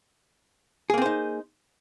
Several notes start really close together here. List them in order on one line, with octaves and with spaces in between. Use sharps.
G#4 A#3 C4 C5 D#4